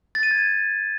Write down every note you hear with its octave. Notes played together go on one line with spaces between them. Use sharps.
A6
D#7
G#6